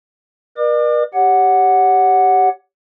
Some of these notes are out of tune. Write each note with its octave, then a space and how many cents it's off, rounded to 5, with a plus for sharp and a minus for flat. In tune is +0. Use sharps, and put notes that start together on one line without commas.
A#4 +45 D5 +45 D6 +35
G4 +0 C#5 +20 F#5 +0